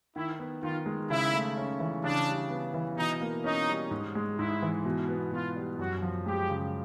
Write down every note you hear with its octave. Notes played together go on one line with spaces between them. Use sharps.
D#3 E4
B3
D#3 F4
G#3
C#3 E4
A3
C#4
E3
C#3 D4
G3
B3
E3
B2 D#4
A#3
C#4 D#4
G3
G#2
G#3
G#2 E4
E3
B2
B3
B2 F4
G3
F#2 F#4
F3
G#3 G4
C#3